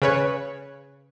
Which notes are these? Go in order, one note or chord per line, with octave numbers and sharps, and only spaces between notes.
C#3 B4 C#5